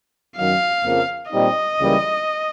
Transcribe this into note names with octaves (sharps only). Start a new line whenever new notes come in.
F#2 D#3 F#3 F5
F2 C#3 F3 A#3
A#2 G3 C4 D#4 D#5
C#2 C#3 E3 G3 A#3